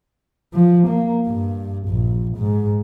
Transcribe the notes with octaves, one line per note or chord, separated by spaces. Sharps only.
F3
A#3
G2
A#1
G#2